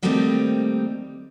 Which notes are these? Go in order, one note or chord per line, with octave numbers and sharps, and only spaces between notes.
D#3 G3 A3 A#3 C4 D#4